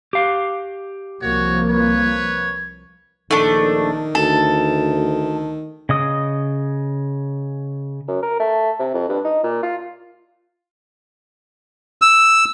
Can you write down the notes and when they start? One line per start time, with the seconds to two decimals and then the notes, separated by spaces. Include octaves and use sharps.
0.13 G4 F5
1.22 C2 F3 A#3 F#4 C#5
1.68 B4 C#5
3.31 A#1 D#3 A3 D4
4.15 D2 A4
5.89 C#3 D#5 D#6
8.08 F#2
8.22 A#4
8.40 A3
8.79 C3
8.94 F2
9.09 G2
9.24 D#4
9.43 A#2
9.63 F4
12.02 E6